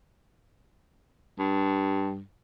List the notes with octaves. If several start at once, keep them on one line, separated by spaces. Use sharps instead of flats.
G2